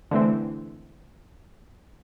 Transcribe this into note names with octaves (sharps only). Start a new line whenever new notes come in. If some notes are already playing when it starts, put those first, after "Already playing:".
D3 E3 A3 C4